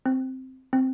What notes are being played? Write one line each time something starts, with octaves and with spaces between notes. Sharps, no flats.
C4
C4